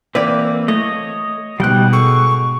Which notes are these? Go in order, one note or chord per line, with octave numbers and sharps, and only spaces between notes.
E3 A#3 C4 B4 D5
A3 C#5 D#5
C#2 G#2 B2 G3 G5 F#6
G#4 A4 C#6